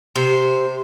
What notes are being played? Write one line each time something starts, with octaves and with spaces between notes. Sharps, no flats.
C3 C5